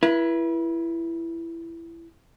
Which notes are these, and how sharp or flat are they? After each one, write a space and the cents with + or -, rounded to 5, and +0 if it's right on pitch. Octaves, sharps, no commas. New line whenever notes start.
E4 +15 B4 -35